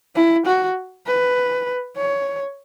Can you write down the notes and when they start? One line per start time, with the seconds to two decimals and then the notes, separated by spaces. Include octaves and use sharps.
0.15 E4
0.46 F#4
1.06 B4
1.97 C#5